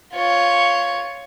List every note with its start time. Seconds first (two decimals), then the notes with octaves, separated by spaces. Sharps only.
0.14 F4 C#5